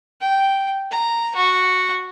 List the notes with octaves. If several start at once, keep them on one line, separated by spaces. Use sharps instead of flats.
G5
A#5
F#4